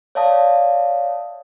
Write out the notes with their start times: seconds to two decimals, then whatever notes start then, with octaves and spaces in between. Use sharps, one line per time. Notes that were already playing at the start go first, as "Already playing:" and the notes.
0.15 C#5 D5 E5 F5 A5 D#6